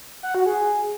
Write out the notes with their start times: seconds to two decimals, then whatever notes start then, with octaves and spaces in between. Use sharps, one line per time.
0.23 F#5
0.35 F#4
0.46 G#4